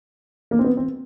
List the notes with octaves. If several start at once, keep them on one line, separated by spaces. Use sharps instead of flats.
A#3
C4
B3
C4